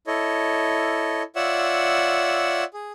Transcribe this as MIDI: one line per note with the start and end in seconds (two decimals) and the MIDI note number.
0.07 1.22 64
0.07 1.22 69
0.07 1.22 73
0.07 1.22 75
1.36 2.64 65
1.36 2.64 73
1.36 2.64 74
1.36 2.64 76
1.36 2.64 78
1.36 2.64 88
2.74 2.92 68